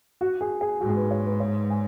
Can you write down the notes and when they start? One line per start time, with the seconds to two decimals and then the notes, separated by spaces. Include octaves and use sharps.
0.21 F#4
0.41 G#4
0.61 G#4
0.80 G#2 F#4
0.89 G#4
0.96 B4
1.11 C#5
1.26 B4
1.40 C#5
1.70 G#5